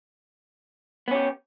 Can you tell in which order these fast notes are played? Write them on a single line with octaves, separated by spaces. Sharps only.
B3 C#4 G4